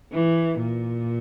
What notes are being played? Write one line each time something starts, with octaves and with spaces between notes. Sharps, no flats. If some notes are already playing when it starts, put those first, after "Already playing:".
E3
A#2